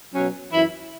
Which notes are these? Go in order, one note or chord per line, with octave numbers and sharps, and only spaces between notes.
B2 F#3 C#4
F#2 E3 E4